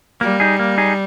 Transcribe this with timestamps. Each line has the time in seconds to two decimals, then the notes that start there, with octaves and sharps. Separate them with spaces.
0.21 G3 A#3
0.40 D#4 G#4
0.59 A#3
0.78 D#4 G#4